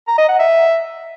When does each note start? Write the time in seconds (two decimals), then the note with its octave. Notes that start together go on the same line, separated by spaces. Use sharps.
0.08 A#5
0.18 D#5
0.29 F#5
0.39 E5